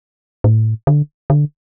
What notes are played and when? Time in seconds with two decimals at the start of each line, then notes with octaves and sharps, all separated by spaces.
0.44 A2
0.87 D3
1.30 D3